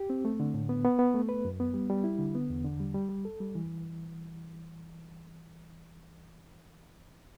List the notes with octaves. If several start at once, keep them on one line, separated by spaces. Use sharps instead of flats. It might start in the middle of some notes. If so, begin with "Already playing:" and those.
Already playing: G4
C4
A3
D3
A2
B3
B3
B3
A3
B4
F#2
B3
G3
G3
E4
D3
B3
E2
D3
G3
G3
G3
A4
G3
E3